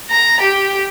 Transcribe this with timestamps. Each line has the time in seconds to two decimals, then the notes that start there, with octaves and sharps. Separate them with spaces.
0.10 A#5
0.41 G4